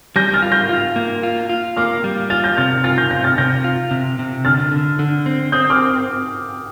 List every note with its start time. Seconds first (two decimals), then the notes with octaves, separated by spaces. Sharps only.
0.16 G3 G6 A#6
0.34 F6 A6
0.42 F4
0.52 G6 A#6
0.69 F4
0.96 A#3
1.23 F4
1.49 F4
1.77 A#3 D6 F6
2.04 G3
2.30 F4 F6 A6
2.44 G6 A#6
2.57 C3 F6 A6
2.84 F4 F6 A6
2.98 G6 A#6
3.10 C3 G6 A#6
3.24 F6 A6
3.38 C3 G6 A#6
3.64 F4
3.91 C3
4.19 C3
4.45 D3 F6 A6
4.72 D3
4.99 D3
5.26 C4
5.52 C4 D#6 G6
5.70 D6 F6